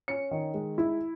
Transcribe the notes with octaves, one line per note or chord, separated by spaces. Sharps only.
C#4 C#7
D#3
G#3
E4